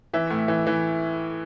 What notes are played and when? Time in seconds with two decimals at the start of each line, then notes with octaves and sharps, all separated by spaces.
0.14 E3 E5
0.30 A2
0.48 E3
0.67 E3